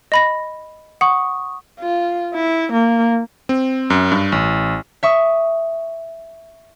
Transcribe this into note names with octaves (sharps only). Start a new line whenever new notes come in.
D#5 B5 A#6
F#5 C#6 D#6
F4
E4
A#3
C4
F#2
G2
A1
E5 C#6 D#6